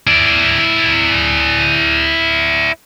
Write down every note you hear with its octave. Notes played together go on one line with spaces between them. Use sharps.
E4 D5